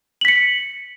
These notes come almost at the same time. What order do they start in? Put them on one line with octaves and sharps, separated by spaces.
F#7 B6 C#7